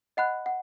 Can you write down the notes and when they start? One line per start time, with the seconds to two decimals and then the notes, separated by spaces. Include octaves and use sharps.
0.17 D#5 F#5 B5 F#6
0.46 F#5